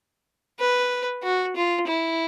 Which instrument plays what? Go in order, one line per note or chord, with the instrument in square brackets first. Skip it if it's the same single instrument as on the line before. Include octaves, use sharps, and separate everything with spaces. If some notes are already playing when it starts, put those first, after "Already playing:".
[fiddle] B4
F#4
F4
E4